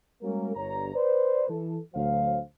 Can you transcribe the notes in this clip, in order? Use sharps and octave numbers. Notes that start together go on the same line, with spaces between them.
G3 G#3 A#3 C#4 F#4 A#4
G1 G2 C#5 A#5
B4 C5 D5
E3 A4
D2 F#3 C5 F5